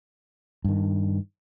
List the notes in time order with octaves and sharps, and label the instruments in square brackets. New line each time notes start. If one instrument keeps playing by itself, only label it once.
[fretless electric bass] G2 D#3